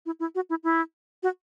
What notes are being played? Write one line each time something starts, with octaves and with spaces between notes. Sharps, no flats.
E4
E4
F#4
E4
E4
F#4